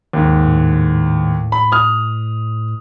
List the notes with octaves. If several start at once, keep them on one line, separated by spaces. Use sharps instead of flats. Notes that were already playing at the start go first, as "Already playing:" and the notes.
D#2 G#2
A2
B5
D#6 F6